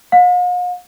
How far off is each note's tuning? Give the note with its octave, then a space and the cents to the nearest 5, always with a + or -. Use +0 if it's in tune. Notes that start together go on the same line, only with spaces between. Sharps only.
F5 +45